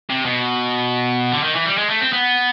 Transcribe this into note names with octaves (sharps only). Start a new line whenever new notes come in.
C3
B2
D3
D#3
E3
G3
G#3
A3
C4
B3